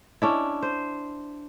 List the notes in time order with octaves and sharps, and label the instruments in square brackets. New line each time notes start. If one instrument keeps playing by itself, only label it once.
[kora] C#4 D4 E4
C5